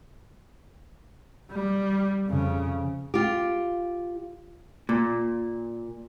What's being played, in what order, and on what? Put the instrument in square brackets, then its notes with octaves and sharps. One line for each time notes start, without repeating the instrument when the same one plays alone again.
[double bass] G3
F2 C#3
[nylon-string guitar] F4 G4
[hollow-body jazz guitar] A#2